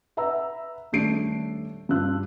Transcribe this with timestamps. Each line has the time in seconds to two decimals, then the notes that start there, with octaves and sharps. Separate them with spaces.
0.17 B4 E5 F#5 A#5 E6
0.92 D#1 A3 D4 A4 C7 D7
1.89 G2 D4 F4 E6 F#6